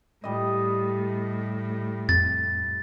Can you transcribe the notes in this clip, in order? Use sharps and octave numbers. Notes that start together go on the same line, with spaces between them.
A2 G3 D#5
F2 A6